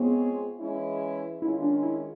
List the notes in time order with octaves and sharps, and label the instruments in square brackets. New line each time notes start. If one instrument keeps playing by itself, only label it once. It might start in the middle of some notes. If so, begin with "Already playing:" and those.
Already playing: [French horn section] G#3 C4 F4 G#4 C#5 [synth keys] B3
[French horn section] E3 G#3 C#4 E4
[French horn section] D#3 G#3 C#4 F4 [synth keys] E4
[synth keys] D4
E4